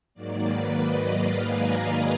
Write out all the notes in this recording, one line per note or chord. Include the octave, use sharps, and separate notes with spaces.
G#2 D#3 F#3 A#3 D5
B4
D#5
F5
G#5
A#5